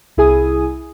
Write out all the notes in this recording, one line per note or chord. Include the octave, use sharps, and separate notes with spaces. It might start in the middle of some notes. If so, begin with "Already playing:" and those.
C2 E4 G#4 G#5 D#6